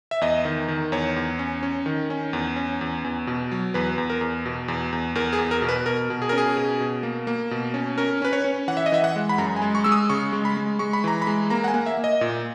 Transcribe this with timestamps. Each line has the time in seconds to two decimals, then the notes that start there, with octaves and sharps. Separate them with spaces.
0.11 E5
0.21 E2 D#5
0.45 D#3
0.68 D#3
0.92 E2 C#5
1.16 E2
1.39 C#4
1.63 C#4
1.86 D#3
2.10 C#4
2.33 E2
2.56 C#4
2.81 E2
3.04 E2
3.27 B2
3.52 F#3
3.74 E2 B4
3.98 E2
4.10 A#4
4.21 E2
4.46 B2
4.68 E2
4.93 E2
5.15 E2 A#4
5.33 G#4
5.38 E2
5.51 A#4
5.62 B2
5.69 B4
5.86 B2 A#4
6.10 B2
6.22 G#4
6.29 C#4 A#4
6.38 G#4
6.57 B2
6.80 B2
7.03 A#3
7.27 A#3
7.51 B2
7.74 C#4
7.98 C#4 A#4
8.22 C#4 B4
8.33 C#5
8.44 C#4
8.68 E3 F#5
8.77 E5
8.86 D#5
8.92 E3 E5
9.04 F#5
9.16 G#3
9.29 B5
9.38 F#2 A#5
9.56 G#5
9.62 G#3
9.75 C#6
9.84 G#3 E6
9.92 D#6
10.09 C#3 C#6
10.33 G#3
10.45 B5
10.57 G#3
10.79 G#3 C#6
10.93 B5
11.04 E3 A#5
11.22 B5
11.27 G#3
11.50 A#3 A#5
11.64 F#5
11.68 G#5
11.74 A#3
11.86 E5
11.98 A#3
12.04 D#5
12.21 A#2